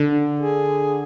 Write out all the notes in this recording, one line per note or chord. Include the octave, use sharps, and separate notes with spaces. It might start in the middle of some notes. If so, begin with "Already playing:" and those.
Already playing: D3
G#4